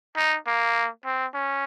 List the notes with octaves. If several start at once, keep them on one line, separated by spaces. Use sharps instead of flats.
D#4
A#3
C4
C#4